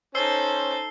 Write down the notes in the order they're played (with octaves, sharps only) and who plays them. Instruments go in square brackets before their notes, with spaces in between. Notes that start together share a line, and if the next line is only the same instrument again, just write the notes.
[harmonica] C#4 [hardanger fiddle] D#4 A4 [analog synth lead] C5 [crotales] E6 C7 G7